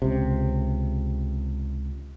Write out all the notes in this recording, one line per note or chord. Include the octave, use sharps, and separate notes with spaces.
C#2 C3